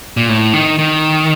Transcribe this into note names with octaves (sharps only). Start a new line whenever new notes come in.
A#2
A2
D#3
D#3